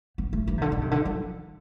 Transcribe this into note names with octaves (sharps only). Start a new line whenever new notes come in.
B3
A3
E3
C3
D3
D3
C3
D3
F3